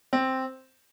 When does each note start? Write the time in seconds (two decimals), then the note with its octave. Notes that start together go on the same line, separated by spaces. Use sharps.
0.13 C4